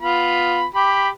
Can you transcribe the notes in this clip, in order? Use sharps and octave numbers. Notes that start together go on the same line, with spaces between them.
B3 F4 B5
G4 B5